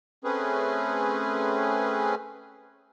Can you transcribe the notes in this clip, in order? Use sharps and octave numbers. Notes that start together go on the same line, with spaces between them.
A3 C4 C#4 G#4 B4